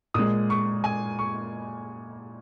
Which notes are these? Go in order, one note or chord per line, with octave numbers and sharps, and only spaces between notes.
A#2 G#3 D#6
C#6
G#5
C#6